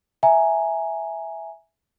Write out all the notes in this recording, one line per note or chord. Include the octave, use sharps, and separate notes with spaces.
E5 G#5 A#5